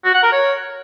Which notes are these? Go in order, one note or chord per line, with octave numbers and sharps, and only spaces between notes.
F#4
F#5
A#4
C#5